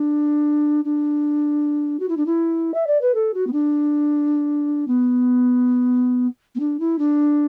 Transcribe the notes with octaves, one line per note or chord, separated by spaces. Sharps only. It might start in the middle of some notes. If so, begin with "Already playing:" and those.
Already playing: D4
D4
F#4
E4
D4
E4
E5
D5
B4
A4
F#4
B3
D4
B3
B3
D4
E4
D4